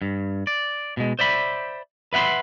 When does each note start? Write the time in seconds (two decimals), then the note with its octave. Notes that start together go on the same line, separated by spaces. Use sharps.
0.02 G2
0.47 D5
0.97 B2 G#3
1.19 C5 D5 E5 B5
2.13 B4 E5 F#5 B5 C6